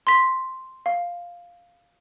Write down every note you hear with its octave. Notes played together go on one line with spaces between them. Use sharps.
C6 B6
F5